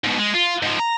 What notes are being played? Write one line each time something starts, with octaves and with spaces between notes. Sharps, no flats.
G#2 B2
G#3
F4
G#2 F3
A#5